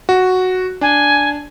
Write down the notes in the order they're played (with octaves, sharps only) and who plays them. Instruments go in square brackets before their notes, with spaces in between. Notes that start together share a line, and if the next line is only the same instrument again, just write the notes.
[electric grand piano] F#4
[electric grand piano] D4 [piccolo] G#5